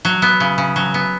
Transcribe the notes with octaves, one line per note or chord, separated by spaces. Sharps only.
F#3
B3
C#3
C#3
F#3
B3